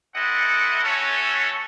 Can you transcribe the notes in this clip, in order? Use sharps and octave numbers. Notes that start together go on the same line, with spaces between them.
C4 E4 A4 D#5 F#5
A3 C#4 F#4 A4 C#5